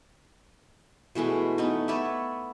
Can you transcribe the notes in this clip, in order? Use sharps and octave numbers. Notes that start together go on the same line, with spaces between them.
B2 E3 G#3 A3
A3 B3 D#4
B3 C#5 D5 E5